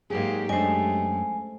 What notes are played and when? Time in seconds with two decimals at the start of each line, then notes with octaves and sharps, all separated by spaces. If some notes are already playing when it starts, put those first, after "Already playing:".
0.10 G#2 F#3 G#3 A#3 G4 G#4
0.49 F#2 G#3 A3 D4 G4 C5 D#5 G#5